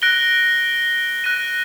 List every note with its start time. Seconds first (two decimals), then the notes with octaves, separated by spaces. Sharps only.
0.02 F#6 A#6 D7 G7
1.24 F#6 A#6 D#7